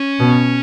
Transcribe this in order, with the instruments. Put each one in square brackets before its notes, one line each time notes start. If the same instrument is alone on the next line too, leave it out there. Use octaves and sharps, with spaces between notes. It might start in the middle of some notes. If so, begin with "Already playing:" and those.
Already playing: [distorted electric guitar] C#4
[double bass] B2